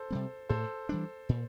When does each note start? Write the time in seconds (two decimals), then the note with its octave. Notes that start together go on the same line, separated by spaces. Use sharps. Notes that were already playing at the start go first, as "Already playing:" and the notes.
Already playing: A4 C5
0.10 C3 G3 C4
0.49 A2 A4 C5
0.89 E3 G3 D4
1.29 A#2